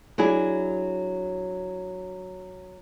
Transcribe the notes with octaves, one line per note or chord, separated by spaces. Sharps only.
F#3 D4 E4 G#4